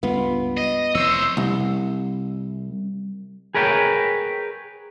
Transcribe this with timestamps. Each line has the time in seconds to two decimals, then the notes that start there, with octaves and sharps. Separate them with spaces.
0.03 C#2 G2 G3 B3 F4
0.57 D#5
0.95 F1 F2 E3 C5 C#5 E6
1.37 C2
3.55 G#4 A#4 B4 C#5 E5 G5